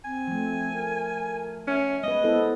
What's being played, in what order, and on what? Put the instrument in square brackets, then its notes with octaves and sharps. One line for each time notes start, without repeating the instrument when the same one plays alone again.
[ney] C4 [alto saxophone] G#5
[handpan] F3 A3
[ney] A#4
[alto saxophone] C#4 [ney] E5
[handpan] G#3 B4 [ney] B3 [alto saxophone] D#5
[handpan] B3 E4 A4 [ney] C5